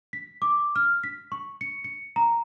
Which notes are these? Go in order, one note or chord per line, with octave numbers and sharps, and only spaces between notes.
B6
D6
F6
B6
C#6
C#7
C#7
A#5